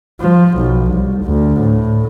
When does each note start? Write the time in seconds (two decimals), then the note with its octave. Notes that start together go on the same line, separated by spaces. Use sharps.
0.21 F3
0.58 B1
0.92 C2
1.23 D2
1.61 A2